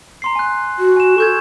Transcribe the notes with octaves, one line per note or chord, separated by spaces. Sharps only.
A#5 C6 C7
G#5 F#6
F#4
G#5 E7
A4 C#6 G6 G#6